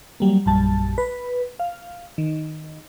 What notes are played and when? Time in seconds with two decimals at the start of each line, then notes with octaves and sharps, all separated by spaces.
0.20 F#3 G3 A#3
0.46 A#1 F#2 G3 A5
0.98 B4
1.59 F5
2.18 D#3